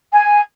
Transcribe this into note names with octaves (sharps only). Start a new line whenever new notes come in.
G#5